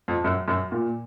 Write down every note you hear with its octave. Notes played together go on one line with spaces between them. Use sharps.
F2
F#2
F#2
A#2